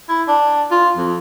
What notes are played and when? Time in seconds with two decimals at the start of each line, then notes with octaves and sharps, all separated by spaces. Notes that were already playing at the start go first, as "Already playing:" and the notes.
0.09 E4
0.28 D4
0.71 F4
0.97 F2